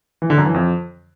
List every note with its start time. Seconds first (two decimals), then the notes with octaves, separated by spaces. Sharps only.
0.22 E3
0.30 D3
0.38 F#2
0.46 E3
0.54 F2